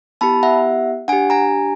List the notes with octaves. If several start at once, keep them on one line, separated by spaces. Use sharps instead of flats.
B3 E4 G4 A5 B5
E5 F#5
D4 G4 F#5 G#5
G#5 A#5